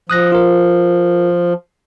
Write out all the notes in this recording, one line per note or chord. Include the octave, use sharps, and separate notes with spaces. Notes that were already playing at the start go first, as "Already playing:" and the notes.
F3 D#6 F#6 A#6
F4 A#4